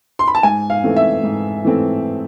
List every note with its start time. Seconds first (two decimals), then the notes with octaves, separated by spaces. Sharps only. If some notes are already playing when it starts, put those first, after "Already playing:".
0.19 C6
0.28 B5
0.35 A5
0.43 G#2 G#5
0.70 F5
0.84 E3 A3 C4
0.96 E5
1.23 G#2
1.65 E3 A3 C4